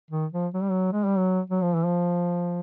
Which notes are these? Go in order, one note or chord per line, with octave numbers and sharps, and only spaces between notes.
D#3
F3
F#3
G3
F#3
G#3
G3
F#3
F#3
F3
E3
F3